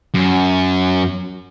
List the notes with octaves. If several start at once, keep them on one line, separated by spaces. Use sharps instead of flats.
F#2